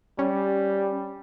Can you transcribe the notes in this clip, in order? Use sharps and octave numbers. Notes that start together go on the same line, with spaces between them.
G3 C#4